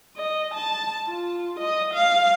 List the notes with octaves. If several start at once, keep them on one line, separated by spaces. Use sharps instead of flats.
D#5
A5
F4
D#5
F5